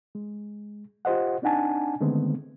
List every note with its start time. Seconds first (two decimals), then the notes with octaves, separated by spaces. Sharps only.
0.15 G#3
1.05 F4 G4 C5 D#5 F#5
1.42 C4 D4 D#4 F#5 G#5 A5
2.00 D3 D#3 G#3 A3 B3 C4